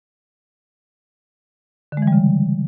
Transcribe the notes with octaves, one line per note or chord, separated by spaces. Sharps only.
D3
G#3
E3
G3
C#3